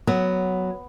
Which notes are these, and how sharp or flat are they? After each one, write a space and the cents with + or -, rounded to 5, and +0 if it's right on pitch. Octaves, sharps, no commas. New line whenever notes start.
F#3 +0 B3 +5